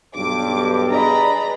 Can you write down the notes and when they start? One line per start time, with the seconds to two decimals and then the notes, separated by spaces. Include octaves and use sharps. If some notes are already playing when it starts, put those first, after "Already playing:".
0.15 B1 G2 D6
0.90 D4 G#4 B4 D5 D#5 A#5 B5